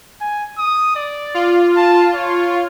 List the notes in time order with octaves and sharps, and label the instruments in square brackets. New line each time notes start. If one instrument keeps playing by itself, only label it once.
[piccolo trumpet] G#5
D#6
D5
[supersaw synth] F4
[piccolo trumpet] A5
C#5